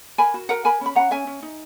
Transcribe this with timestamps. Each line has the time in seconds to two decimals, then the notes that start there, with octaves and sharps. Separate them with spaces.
0.18 A#4 G#5 B5
0.34 F#4
0.49 A#4 F#5 A#5
0.65 A#4 G#5 B5
0.81 C#4 B5
0.96 C#4 F#5 A#5
1.11 C#4 E5 G#5
1.27 C#4
1.42 D#4